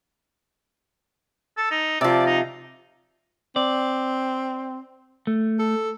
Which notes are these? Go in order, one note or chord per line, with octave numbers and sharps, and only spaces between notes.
A4
D#4
C3 F3 D5
D#4
C4 D5
A3
A4